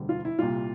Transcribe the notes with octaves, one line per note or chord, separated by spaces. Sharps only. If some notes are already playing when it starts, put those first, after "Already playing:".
Already playing: E1 D2 D3 G3
F4
E4
C2 A#2 G3 F4